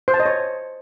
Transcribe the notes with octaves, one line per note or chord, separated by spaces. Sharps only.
C5
A5
D#5
C#5